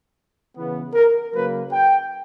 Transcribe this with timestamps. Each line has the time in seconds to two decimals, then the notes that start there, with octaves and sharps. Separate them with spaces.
0.55 C#3 E3 B3
0.94 A#4
1.33 C#3 F#3 A#3 B4
1.72 G5